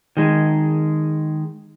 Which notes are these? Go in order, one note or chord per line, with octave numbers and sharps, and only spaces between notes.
D#3 G#3